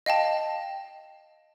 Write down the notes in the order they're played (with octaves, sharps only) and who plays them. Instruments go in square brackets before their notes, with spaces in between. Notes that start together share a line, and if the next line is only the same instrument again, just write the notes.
[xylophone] D#5 F5 G5 A5